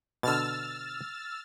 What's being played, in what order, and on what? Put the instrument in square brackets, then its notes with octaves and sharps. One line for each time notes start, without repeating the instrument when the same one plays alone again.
[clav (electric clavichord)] B2 D3 [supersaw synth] E6 F6 A6